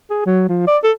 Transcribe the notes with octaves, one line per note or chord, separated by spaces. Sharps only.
G#4
F#3
F3
D5
A4